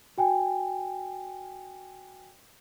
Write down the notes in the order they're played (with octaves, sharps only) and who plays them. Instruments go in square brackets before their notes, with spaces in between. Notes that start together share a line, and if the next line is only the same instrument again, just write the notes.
[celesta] F#4 G5 G#5